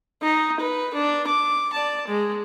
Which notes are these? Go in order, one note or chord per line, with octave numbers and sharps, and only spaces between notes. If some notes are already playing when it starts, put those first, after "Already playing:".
D#4
B4
D4
D6
D5 A5
G#3